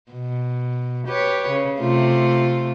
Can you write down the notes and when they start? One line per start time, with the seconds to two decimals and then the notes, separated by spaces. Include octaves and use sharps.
0.11 B2
1.07 G4 B4 C#5
1.48 C#3
1.80 C3 A3 F4